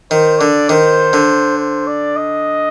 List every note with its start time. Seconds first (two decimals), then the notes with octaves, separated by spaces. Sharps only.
0.11 D#3 C5
0.40 D3 D5
0.69 D#3 C5
1.13 D3
1.58 C5
1.87 D5
2.16 D#5